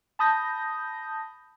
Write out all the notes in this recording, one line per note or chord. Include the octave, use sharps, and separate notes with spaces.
A5 B5 D#6 G6 A#6